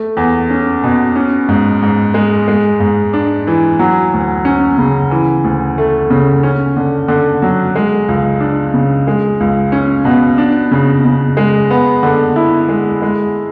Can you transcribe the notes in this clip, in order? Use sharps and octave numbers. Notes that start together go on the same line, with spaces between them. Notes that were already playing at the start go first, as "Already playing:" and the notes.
Already playing: A3
E2
C#4
B2
C#4
G#2
G#2
G#3
G#3
G#2
D4
E3
F#3
D2
C#4
C#3
E3
D2
A3
C#3
C#4
D3
D3
F#3
G#3
C#2
D4
C#3
G#3
C#2
C#4
B2
D4
C#3
C#3
G#3
B3
D3
E4
G#3
G#3